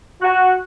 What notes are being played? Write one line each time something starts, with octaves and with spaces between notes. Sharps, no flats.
F#4